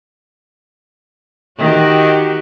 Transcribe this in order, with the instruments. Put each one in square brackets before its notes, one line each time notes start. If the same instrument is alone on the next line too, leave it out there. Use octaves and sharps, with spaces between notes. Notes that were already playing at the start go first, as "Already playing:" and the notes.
[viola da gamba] D#3 F#4 G4